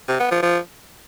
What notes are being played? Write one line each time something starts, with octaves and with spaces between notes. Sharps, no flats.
C3
B3
F3
F3